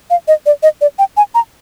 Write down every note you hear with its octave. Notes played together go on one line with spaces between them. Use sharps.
F5
D#5
D5
D#5
D5
G5
G#5
A#5